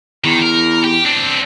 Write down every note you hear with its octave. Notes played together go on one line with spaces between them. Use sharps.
E2 D#3
A#4
G4
C4 D4